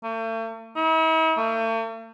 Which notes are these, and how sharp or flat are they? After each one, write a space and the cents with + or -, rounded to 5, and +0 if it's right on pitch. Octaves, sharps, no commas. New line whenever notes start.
A3 +40
E4 -45
A3 +45